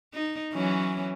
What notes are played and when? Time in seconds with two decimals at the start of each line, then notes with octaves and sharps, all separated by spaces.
0.14 D#4
0.53 E3 F#3 C#4